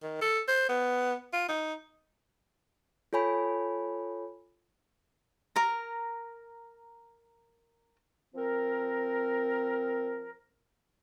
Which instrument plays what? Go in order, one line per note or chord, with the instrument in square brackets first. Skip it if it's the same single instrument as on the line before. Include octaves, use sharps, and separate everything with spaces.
[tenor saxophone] D#3
A4
C5
B3
F4
D#4
[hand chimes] F4 A4 C#5 G#5 B5
[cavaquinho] A#4 A#5
[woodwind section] F3 C4 A#4